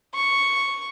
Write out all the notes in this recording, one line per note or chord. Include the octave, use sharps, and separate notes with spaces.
C#6